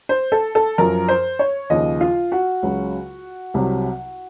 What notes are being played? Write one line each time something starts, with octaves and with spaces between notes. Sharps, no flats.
C5
A4
A4
F#2 F3 A#4
C5
C#5
D#2 C#3 F3 D#5
F4
F#4
C#2 C#3 F#3
C2 C3 F#3